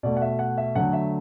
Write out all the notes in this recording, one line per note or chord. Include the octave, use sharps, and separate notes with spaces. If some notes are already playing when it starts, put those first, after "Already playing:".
B2 A3 D5
F#5
E5
F#5
E5
D3 F#3 A3 F#5
E5